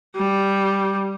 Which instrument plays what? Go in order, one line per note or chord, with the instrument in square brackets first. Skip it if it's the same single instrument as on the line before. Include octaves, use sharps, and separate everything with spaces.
[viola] G3